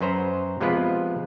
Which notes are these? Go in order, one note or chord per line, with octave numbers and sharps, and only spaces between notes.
F#2 F#3 B4 C5 A#5
C3 F3 G#3 B3 F4 B4